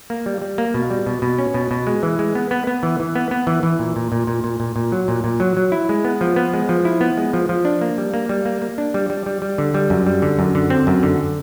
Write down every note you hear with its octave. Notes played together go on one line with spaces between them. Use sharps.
A#3
G3
G3
A#3
B2
G3
B2
B2
C#4
B2
B2
G#3
E3
G#3
B3
B3
B3
E3
E3
B3
B3
E3
E3
A#2
A#2
A#2
A#2
A#2
A#2
A#2
F#3
A#2
A#2
F#3
F#3
E4
G#3
B3
F3
B3
G#3
F3
E4
B3
G#3
F3
F3
D4
A#3
G3
A#3
G3
A#3
A#3
D4
G3
G3
G3
G3
D3
G3
F#2
G3
D3
F#2
D3
C4
F#2
D3